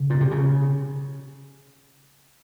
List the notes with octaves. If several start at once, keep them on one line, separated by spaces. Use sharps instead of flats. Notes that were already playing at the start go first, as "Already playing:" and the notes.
Already playing: C#3
A#2
C3
C#3